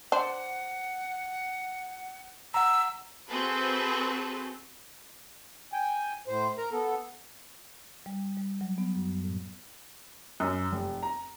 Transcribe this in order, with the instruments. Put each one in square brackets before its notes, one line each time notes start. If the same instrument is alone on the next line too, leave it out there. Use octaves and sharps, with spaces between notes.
[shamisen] D4 C5 [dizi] F#5
[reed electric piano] F#5 A#5 [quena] E6
[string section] C4 F#4 G#4 A4 B4
[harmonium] G5 G#5
A2 C5
A#4 A#5
B3 A4
[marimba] G3
G3
F#3
B3
F#2
A2
[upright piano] F#2
F1
A#5